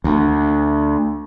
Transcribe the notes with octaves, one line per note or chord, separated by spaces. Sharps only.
D2